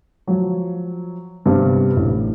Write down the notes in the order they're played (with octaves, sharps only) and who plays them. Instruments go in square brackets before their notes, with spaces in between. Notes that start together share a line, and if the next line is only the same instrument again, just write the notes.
[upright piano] F3 F#3
G2 C3 G3 B3 C4
A1